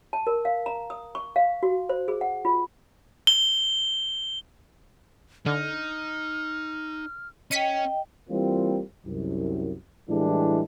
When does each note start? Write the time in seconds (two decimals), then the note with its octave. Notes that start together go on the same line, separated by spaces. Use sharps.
0.13 A5
0.27 A#4
0.45 F5
0.66 A#5
0.90 D#6
1.15 C#6
1.36 F5
1.63 F#4
1.89 C5
2.08 G#4
2.21 F#5
2.45 F4
3.27 G7
5.46 D3 D#4 F6
7.51 C#4 D#5 G5 B6 C#7 D#7
8.30 E3 G3 A#3 C4 F4
9.06 C2 F#2
10.10 A2 E3 G3 G#3 D4